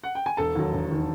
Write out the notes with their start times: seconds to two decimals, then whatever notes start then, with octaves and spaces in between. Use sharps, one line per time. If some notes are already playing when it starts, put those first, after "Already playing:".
0.04 F#5
0.15 G5
0.26 G#5
0.37 E1 A4 A5
0.55 D#2 D#3 F#3
0.73 E1
0.91 D#3 F#3